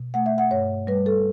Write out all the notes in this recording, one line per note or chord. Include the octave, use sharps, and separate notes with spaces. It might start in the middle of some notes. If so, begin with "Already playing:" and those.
Already playing: B2
A3 F#5
E5
F#5
G2 C#5
G3 B4
A4